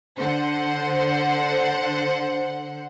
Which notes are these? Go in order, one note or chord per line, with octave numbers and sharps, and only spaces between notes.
D3 C5 F#5